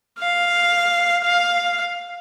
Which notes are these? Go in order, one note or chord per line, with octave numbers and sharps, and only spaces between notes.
F5
F5